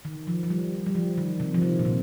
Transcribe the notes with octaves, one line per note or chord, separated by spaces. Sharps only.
D#3
F3
F3
G3
G3
F3
D#3
C3
F3
D#3
A#2
C3